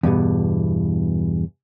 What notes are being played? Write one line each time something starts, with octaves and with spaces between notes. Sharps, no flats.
E2 G2 B2